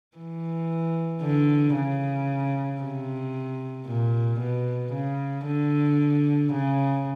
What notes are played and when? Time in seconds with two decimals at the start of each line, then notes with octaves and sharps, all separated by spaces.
0.17 E3
1.22 D3
1.76 C#3
2.81 C3
3.87 A#2
4.40 B2
4.93 C#3
5.46 D3
6.52 C#3